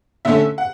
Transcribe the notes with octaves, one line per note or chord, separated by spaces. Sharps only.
D3 A3 C#4 E5
F#5